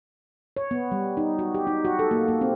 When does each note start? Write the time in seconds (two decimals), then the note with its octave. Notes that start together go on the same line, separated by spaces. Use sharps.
0.57 C#5
0.71 B3
0.92 G3
1.17 D#4
1.39 F#4
1.55 G4
1.67 D#4
1.85 F#4
1.99 A4
2.11 A#3
2.28 A#3
2.41 C4